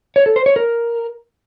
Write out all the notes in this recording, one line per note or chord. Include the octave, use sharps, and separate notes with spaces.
C#5
A4
C5
C#5
A#4